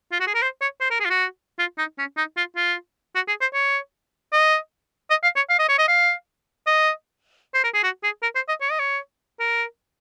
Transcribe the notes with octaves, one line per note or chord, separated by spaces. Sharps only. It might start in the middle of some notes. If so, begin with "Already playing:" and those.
F4
F#4
G#4
A#4
C5
C#5
C5
A#4
G#4
F4
F#4
F4
D#4
C#4
D#4
F4
F4
F#4
G#4
C5
C#5
D#5
D#5
F5
C#5
F5
D#5
C#5
D#5
F5
D#5
C5
A#4
G#4
F#4
G#4
A#4
C5
D#5
C#5
D#5
C#5
A#4